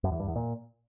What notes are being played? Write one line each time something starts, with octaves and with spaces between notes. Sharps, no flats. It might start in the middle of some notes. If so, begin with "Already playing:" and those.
F#2
E2
G2
E2
A#2